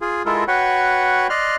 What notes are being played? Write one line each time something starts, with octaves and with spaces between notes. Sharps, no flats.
F4 G#4
G#3 E4 F4 A4 A#4
F#4 B4 C#5 F#5 G5
D5 D#5 C6 F6 F#6